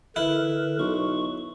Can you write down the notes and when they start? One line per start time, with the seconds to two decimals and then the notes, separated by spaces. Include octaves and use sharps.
0.16 D3 E4 A#4 B4
0.79 B1 C#6